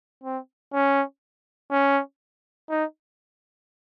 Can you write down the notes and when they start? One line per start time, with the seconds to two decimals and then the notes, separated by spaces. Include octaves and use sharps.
0.24 C4
0.73 C#4
1.71 C#4
2.70 D#4